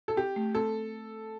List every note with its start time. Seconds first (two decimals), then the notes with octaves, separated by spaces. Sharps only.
0.08 A4
0.16 C4 G4
0.36 A3
0.55 C4 A4